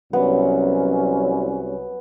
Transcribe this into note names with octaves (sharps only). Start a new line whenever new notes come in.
C2 F#3 B3 C#4